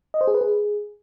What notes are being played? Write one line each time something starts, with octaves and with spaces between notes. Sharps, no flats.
D#5
C5
G#4
B4
G#4